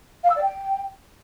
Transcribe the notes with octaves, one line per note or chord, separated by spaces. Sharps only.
F5
E6
D5
G5